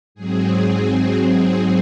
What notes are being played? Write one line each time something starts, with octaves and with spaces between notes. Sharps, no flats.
G#2 F#3 C4 G#4
G#4
G#4